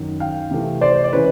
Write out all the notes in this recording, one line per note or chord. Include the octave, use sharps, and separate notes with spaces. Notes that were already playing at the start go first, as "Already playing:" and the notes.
Already playing: F#2 D#3 F#3
F5 G5
C3 E3 A3
C5 D5
D5
C#3 E3 G#3 B4 C#5